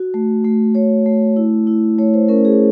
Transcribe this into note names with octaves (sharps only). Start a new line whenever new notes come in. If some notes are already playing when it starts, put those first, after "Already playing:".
Already playing: F#4
A3
A3
A3 C#5
A3
E4
E4
A3 C#5
C5
C#4 A#4
G#4